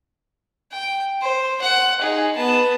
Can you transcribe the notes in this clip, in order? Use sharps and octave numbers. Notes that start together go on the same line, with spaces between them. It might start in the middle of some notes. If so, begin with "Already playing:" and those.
G5
C5
F#5
D#4 G#4
B3 A5